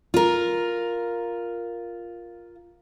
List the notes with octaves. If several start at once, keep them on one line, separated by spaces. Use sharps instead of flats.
F4 A#4